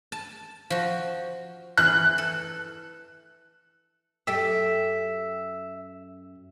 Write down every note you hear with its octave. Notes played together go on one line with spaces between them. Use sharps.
A5
F3 F#4
E3 F#6
A4
F#2 G4 A4 E5